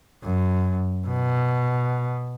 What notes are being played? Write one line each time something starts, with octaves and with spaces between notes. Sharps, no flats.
F#2
B2